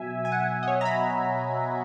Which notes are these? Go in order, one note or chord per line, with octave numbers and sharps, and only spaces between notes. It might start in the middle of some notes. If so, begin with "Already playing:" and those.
Already playing: B2 F#3 E5 G#5
G#5
F#5
D#5
C#5
A#5
B5